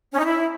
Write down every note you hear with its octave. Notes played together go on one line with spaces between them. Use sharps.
C#4
D#4
E4